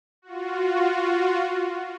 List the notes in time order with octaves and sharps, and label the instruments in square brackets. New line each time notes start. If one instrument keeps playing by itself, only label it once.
[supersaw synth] F4 F#4